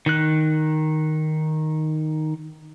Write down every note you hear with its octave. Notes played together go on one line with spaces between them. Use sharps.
D#3 F#6